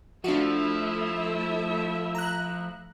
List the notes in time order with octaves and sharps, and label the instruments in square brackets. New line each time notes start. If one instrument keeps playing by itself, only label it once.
[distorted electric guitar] F3 [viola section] A3 E4 E5 [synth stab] D4 F#4
[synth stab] A#5 F#6